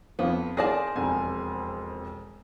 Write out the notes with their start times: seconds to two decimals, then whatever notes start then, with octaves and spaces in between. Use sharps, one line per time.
0.19 F2 B3 C5 F5
0.57 G#4 A#4 C5 D5 A5 A#6
0.96 E1 F2 G#5